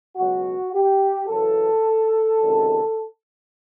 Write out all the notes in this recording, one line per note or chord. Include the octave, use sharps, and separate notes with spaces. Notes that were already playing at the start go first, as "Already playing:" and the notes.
C#2 B2 F#3 F#4
G4
F#2 C#3 E3 A4
C#2 C3 D#3 F#3